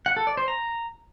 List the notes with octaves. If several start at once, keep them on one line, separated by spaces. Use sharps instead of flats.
F#5
A4
D5
C5
A#5